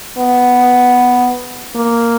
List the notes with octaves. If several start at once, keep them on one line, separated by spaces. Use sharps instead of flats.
B3
A#3